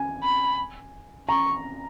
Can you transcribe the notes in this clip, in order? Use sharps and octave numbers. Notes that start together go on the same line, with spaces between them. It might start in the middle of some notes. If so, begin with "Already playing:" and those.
Already playing: G#5
B5
A#5 C#6